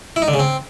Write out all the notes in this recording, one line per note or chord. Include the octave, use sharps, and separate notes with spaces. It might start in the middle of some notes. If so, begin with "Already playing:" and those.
E4
D#4
D3
C#3
C4